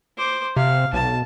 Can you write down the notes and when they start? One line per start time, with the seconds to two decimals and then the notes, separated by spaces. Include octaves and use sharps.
0.17 C5 D6
0.56 C3 F5
0.93 B1 A5